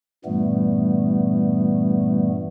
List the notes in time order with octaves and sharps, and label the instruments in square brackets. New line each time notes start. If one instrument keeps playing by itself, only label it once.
[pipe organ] G2 A#2 E3 G3 A3 B3